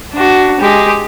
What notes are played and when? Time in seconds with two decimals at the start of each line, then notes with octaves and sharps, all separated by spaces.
0.13 D4 F#4
0.60 G#3 G4